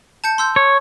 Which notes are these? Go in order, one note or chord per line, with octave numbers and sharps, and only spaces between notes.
A5 G6 C#7
C6 E6 G6
C#5